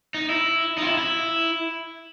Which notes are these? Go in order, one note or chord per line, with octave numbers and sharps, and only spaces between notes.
D#4
E4
D#4
F4
E4
E4